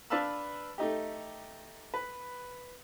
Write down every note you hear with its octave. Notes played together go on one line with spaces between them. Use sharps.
D4 B4 F5 A5 B5 E6
A3 D#4 G4
B4